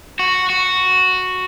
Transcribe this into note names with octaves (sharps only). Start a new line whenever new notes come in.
F#4
F#4